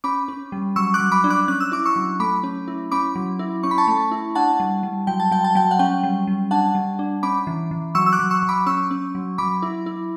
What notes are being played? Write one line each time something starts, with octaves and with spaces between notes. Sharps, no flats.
C#4 B5 D6
C#4
G3
F#3 C#6 E6
D6 F#6
F#3
B5 D6
D4
D6 F#6
C#4 F#6
E6
E4 D6
C#6 E6
F#3
A3 B5 D6
C#4
E4
C#4 B5 D6
F#3
E4
C#4 C#6
B5
A5 C#6
A3
E4
D4 F#5 A5
G3
G3
F#3 G5
A5
F#3 G5
A5
F#3 G5
F#5
C#4 G5
G3
G3
D4 F#5 A5
G3
D4
C#4 B5 D6
E3
E3
F#3 C#6 E6
E6
D6 F#6
F#3
C#6 E6
F#3
B5 D6
C#4 C#6 E6
C#4
F#3
F#3 B5 D6
E4
E4